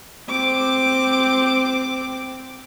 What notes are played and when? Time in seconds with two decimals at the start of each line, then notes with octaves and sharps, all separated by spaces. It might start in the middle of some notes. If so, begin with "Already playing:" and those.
0.29 C4 D6